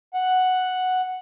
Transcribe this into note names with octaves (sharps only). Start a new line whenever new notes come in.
F#5